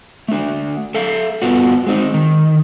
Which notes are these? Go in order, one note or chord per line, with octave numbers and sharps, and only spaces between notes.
A3 D4
A4 E5 F5
G2 B3 F4 F#4
G#3 C4 D#4
D#3